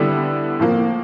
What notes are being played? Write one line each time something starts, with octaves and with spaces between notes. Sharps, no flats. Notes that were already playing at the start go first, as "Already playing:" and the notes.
Already playing: D3 G3 B3 E4
A2 F3 A#3